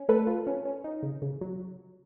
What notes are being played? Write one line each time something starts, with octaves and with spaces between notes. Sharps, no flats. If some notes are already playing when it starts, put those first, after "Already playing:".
Already playing: C#4
A3 A4 B4
F4
C#4
C#4
D#4
C#3
C#3
F#3